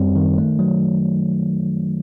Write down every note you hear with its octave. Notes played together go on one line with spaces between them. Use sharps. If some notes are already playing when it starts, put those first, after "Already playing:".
Already playing: F#2 G3 C4
D#3
A3
F#3